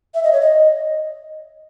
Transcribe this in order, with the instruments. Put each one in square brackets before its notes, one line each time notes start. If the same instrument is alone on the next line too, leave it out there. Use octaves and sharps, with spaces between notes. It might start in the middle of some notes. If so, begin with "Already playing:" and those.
[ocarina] E5
D#5
C#5
D#5